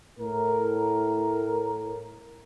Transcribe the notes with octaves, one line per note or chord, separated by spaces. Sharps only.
A2 A#4